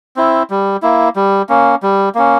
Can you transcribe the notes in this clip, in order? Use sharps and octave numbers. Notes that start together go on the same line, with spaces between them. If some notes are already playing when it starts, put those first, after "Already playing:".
C4 E4
G3
A#3 E4
G3
A#3 C#4
G3
A#3 C#4